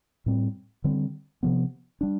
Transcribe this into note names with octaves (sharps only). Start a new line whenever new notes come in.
A2 G3 C4
D3 G3 C4
C3 F3 B3
G3 D4